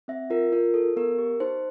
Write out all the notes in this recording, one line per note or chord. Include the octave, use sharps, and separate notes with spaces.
C4 E5
F4 A#4
F4 A#4
A4
B3 A#4
G4
D#4 C5